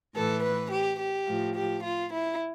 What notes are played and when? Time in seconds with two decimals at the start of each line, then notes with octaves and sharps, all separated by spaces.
0.15 A2 E3 A4
0.43 B4
0.72 G4
1.00 G4
1.27 A2 F3
1.55 G4
1.84 F4
2.12 E4